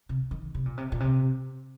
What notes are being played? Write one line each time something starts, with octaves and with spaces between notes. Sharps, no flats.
C3
D#3
C3
A#2
C3
A#2
C3